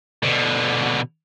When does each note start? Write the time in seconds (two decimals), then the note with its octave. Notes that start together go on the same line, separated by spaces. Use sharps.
0.23 B2 D3